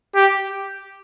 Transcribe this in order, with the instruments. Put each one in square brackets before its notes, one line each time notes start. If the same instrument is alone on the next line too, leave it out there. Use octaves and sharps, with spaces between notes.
[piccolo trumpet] G4